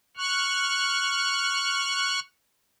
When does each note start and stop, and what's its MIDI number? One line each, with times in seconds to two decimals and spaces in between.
0.17 2.20 85
0.17 2.20 89
0.17 2.20 90